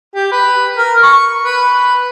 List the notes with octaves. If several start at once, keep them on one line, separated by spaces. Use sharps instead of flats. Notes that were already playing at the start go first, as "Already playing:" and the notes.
G4
B4
A#4
C#6
B4